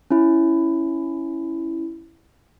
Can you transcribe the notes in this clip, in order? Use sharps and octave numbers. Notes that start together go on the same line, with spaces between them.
C#4 E4